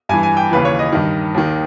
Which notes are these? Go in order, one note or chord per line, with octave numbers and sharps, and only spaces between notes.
G2 E3 G#5
G#5
G5
D#2 C#3 E3 B4
C#5
D#5
G2 D#3
D#2 D#3